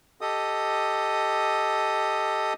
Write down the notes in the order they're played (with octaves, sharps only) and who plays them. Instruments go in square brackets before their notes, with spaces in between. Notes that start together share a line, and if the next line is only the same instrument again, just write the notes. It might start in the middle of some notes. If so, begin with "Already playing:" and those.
[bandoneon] G4 A4 D#5 D#6